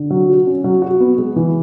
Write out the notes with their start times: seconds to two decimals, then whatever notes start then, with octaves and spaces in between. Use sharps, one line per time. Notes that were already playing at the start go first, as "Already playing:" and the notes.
Already playing: D3
0.10 F#3
0.29 F#4
0.47 C#4
0.64 F#3
0.82 F#4
1.00 B3
1.18 G#3
1.36 E3